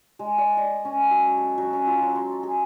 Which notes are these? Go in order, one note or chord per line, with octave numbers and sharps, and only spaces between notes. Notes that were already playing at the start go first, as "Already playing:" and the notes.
G#3
D5
D#5
C#4
F#3
A4
F#3
C#4
F4
F#3
C6
G#4